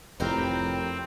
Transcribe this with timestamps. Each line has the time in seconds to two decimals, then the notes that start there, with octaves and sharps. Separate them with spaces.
0.20 F1 F2 A2 C4 G4 A#4 B4